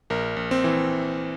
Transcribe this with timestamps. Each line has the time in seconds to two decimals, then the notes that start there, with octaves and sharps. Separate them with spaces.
0.10 A#1 A#4
0.37 A#1
0.51 C4
0.64 E3